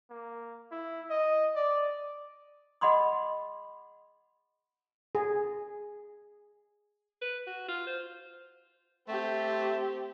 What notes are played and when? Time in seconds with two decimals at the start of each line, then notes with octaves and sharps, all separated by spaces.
0.10 A#3
0.72 E4
1.10 D#5
1.56 D5
2.81 G#4 D#5 F#5 B5 C6 D#6
5.15 G#4
7.22 B4
7.47 F#4
7.69 F4
7.87 C5
9.08 A3 C4 G4